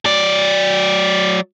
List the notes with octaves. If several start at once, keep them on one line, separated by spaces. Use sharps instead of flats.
F#3 D5